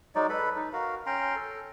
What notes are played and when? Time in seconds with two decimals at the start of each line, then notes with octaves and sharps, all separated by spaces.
0.15 F#3 G#3 D#4 D5
0.29 A4 B4 B5
0.56 D#4
0.73 F#4 A#4 F5
1.06 C#4 G5 A#5 C6
1.36 A4